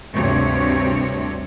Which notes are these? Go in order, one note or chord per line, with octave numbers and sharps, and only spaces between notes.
D2 G2 C3 C#5